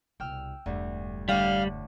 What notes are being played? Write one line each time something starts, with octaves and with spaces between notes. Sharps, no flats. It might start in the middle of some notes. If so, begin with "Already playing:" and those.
C2 B2 G5 E6 F6
E1 D2 G2 G3
A2 D3 G3 D4 F5